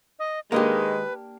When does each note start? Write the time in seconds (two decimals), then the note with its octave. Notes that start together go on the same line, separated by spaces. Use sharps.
0.19 D#5
0.52 D#3 G#3 A#3 D4 G4 B4